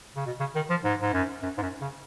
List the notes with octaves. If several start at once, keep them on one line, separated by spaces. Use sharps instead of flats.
C#3
B2
C#3
D#3
F3
G#2
G#2
F#2
F#2
G#2
F#2
C#3